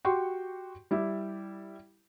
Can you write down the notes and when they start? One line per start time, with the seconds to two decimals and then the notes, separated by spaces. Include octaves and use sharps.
0.05 F#4 G4 G5 C6 C#6
0.91 G3 E4 G4